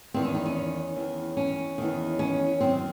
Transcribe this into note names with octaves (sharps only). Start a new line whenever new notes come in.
E2 D#3 C4
C#4
D#4
C#4
E2 D#3
C#4
E2 D#3
C#4
F#2 D#3 C4